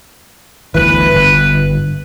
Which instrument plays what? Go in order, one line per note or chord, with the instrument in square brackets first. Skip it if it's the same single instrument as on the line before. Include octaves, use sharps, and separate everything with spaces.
[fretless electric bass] G1 D2 E3 [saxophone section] B4
[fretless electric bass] G1